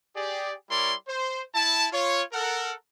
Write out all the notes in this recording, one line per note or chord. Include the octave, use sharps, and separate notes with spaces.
G4 G#4 D5
G3 E4 A#4 C#5 D5 C6
C5
E4 A5
F4 C#5
A4 A#4 F#5